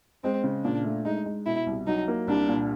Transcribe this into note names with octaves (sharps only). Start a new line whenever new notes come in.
G#3 C4
C#3
A#2 D4
A3
G#3 D#4
G#3
B2 E4
C2
F#3 D#4
A#3
C2 D4
A#2